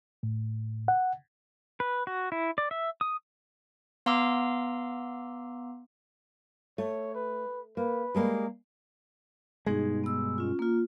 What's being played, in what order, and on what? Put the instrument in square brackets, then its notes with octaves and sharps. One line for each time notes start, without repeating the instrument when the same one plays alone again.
[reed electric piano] A2
F#5
[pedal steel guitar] B4
F#4
E4
D5
E5
D#6
[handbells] B3 F5 A#5 C6 D6 E6
[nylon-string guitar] A3 [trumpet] C#5
[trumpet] B4
[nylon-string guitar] A#3 [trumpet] B4
[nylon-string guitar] G3 G#3 A#3
[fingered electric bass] G2 B2 G#3 [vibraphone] D#4 G#4
[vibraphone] B3 E6
C#4 F4
A#3 F4